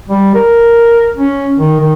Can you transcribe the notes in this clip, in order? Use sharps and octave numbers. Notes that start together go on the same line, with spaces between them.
G3
A#4
C#4
D#3
D#3